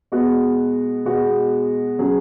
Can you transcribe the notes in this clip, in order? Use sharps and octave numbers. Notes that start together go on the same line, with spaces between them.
B2 G#3 B3 F#4
B2 G#3 B3 F#4
F#3 C#4 G#4